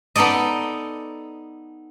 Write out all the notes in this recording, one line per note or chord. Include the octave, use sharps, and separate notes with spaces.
B3 D#4 A4 D5 D#5